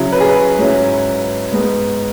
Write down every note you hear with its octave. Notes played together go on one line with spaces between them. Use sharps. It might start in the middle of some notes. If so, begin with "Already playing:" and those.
Already playing: C#3 F#3 E4 C#5
B4
G#4
B4
G#2 F#3 C#4 E4
G#2 G#3 B3